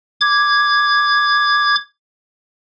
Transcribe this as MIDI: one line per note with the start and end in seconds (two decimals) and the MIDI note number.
0.21 1.75 86
0.21 1.75 92